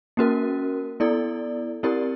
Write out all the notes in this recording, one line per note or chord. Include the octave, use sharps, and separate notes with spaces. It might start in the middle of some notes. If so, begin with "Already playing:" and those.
A#3 C#4 F#4 A#4
B3 E4 A4 D5
C4 E4 G4 A#4 D5